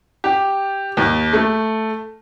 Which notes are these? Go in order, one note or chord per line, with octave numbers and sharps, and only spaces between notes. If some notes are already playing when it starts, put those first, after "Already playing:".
G4
D#2
A3